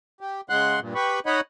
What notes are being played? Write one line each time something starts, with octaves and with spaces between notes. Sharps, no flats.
G4
C#3 G#3 F#5 C6 F#6
G2 A#2
G4 B4 B5 C#6
D#4 C#5 D#5 F#5 B5